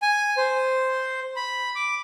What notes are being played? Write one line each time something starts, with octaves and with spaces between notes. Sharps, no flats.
G#5
C5
B5
D6